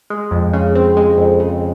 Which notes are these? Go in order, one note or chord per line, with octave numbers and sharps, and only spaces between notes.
G#3
F2
C#3
C4
G#3
F2
C#3